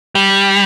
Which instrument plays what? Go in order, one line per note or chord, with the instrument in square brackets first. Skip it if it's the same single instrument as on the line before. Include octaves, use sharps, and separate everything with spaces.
[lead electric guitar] G3